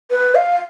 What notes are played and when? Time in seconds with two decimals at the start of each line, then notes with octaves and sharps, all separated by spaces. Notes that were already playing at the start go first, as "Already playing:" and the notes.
0.11 B4
0.35 F5